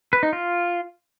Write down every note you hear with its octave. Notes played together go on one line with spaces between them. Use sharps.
B4
D#4
F4